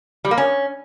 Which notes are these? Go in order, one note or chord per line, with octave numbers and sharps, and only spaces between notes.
G3
A#3
C#4